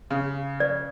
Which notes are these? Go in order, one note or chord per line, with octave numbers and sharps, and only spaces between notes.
C#3
D5